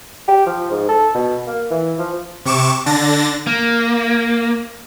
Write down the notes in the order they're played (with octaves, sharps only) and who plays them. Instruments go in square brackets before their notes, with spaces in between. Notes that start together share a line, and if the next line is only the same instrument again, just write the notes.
[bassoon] G4
F3
G#2
A4
B2
A#3
E3
F3
[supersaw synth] C3 C#6 D6 E7
D3 D4 A6 A#6
[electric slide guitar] A#3